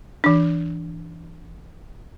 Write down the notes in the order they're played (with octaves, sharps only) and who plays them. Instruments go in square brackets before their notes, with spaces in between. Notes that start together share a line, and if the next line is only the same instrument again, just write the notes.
[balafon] E3 D4